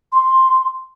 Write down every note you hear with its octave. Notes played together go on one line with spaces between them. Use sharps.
C6